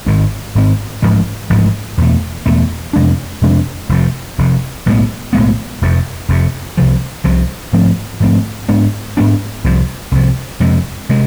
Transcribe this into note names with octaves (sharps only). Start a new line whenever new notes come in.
G#1 G#2 G#3 C4
G#1 G#2 G#3 C4
A1 G#2 F3 G#3
A1 G#2 F3 G#3
E2 B2 A3
E2 B2 A3
F2 C3 G#3 D4
F2 C3 G#3 D4
F1 F2 C3
F1 F2 C3
B1 A2 G#3 B3
B1 A2 G#3 B3
F1 F2 C3
F1 F2 C3
C2 C3 F3
C2 C3 F3
G#2 F3 A3 C4
G#2 F3 A3 C4
G#2 G#3 B3 D4
G#2 G#3 B3 D4
C2 C3 F3
C2 C3 F3
F2 C3 G#3
C3 G#3